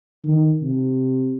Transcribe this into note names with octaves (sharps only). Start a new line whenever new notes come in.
D#3
C3